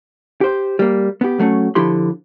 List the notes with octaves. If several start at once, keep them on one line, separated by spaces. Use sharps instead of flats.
G4 C5
G3 A#3
B3 G4
F#3 A3 C#4
D3 F3 E4 G4 B5 C6